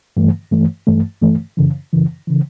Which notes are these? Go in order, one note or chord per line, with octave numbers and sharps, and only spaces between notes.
G2 E3 A3
G2 E3 A3
G2 E3 A3
G2 E3 A3
F#2 C#3 E3
F#2 C#3 E3
C#3 E3